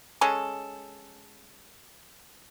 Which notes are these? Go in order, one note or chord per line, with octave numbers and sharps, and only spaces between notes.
G#3 C#4 A4